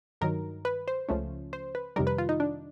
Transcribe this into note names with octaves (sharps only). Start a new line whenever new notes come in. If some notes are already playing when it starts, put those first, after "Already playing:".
G2 D#3 F#3 A#4
B4
C5
C#2 C#3 F3 A3 C#4
C5
B4
F2 C3 D#3 G3 A#4
B4
F4
D#4
D4